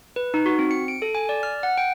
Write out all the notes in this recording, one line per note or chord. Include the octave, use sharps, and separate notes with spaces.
B4
D#4
F#4
C4
C#7
D7
A4
G#5
D5
F6
F#5
G5